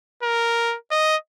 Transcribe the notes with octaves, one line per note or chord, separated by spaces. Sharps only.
A#4
D#5